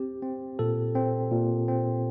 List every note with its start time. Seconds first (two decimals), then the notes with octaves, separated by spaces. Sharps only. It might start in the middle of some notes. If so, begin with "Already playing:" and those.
Already playing: C4 G4
0.23 C4
0.59 A#2 A4
0.95 C4
1.32 A#2
1.68 C4